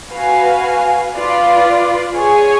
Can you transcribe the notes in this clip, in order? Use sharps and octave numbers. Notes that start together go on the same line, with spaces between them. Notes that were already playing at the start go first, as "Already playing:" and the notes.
F#4 B4 F5 G#5
F4 B4 D5
G#4 C#5 G#5